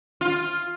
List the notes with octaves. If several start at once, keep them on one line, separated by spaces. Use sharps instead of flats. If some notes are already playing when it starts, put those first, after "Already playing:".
F4